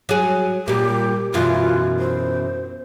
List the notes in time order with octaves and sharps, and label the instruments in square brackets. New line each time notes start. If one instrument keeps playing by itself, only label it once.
[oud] F#3 G#4
[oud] A#2 G3 [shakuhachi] G4
[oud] F#2 B2 E3 [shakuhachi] F4
[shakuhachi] C5